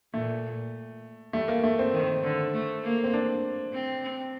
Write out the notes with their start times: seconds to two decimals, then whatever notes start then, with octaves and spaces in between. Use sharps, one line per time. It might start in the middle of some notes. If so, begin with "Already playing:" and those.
0.14 A#2 A3
1.33 G3 A3
1.48 A#3
1.64 A3
1.79 C4
1.94 D#3
2.23 D3
2.54 A3
2.83 A#3
3.04 C4
3.13 D4
3.73 C4